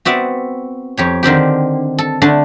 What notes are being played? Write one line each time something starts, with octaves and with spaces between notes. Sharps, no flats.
B3 C4 F#4 D5 E5
F2 G4 C#5
D3 D#3 C4 G4
A4
D3 A3 D4